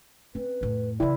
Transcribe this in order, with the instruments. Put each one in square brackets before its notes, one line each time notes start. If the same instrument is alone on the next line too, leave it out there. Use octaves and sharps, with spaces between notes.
[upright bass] C4 C#4 [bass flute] B4
[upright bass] F2 A2
[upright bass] C#3 E3 [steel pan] E4 [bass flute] D5